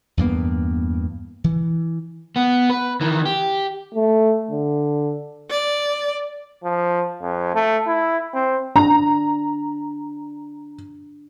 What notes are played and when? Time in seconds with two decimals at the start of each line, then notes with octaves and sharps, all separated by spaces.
0.17 E2 G2 A#3 B3
1.44 E3
2.36 B3
2.70 B4
3.01 D#3 E3
3.26 G4
3.94 A3
4.51 D3
5.50 D5
6.64 F3
7.22 F2
7.54 A3
7.87 E4
8.34 C4
8.76 D4 A#5